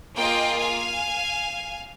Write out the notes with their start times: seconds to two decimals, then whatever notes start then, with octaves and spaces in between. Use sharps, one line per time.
0.17 A#3 F4 G#4 D#5 G5
0.58 F5 G#5